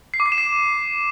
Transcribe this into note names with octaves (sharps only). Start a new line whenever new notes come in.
C7
D6
C7
E7
C7